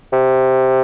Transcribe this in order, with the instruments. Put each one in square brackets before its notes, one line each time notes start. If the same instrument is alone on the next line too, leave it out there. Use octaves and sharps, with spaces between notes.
[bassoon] C3